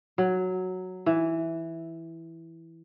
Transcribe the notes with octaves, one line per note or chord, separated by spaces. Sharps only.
F#3
E3